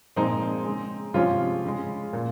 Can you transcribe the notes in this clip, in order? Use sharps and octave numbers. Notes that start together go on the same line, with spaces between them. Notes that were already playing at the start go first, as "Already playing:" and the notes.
A#2 F3 G#3 C4 D#4
C#3 G#3
C3 F3 G#3 C#4 F4
C#3 G#3
A#2